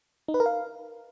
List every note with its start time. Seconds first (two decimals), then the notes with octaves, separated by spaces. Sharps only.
0.28 D#4
0.34 B4
0.40 A#4
0.46 F5